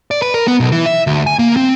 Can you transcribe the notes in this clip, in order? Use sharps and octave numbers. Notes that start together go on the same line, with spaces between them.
D5
B4
A#4
B3
B1
E3
E5
D2
G#5
A#3
C4